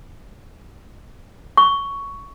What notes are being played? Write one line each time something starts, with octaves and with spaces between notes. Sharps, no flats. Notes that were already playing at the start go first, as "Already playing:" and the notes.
C#6